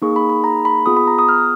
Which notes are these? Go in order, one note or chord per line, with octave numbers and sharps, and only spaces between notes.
A#3 D#4 G#4 C#6
B5
B5
A#5
B5
B3 F4 G#4 D#6
B5
A#5
D#6
F6